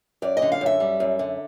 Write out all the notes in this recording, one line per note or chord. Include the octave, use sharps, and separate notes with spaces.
F#2 D5
D#5
D3
F5
F#2 E5
G3
F#2
D3